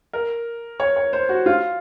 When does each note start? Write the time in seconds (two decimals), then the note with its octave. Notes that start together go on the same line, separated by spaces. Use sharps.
0.13 A#4
0.80 C#5
0.96 C#5
1.13 C5
1.29 F#4
1.46 F4